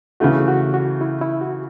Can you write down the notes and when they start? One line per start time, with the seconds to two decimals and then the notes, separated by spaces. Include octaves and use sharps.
0.20 C#3 E3 A3 F#4
0.48 F#4
0.74 F#4
1.01 E4
1.22 E4
1.41 F#4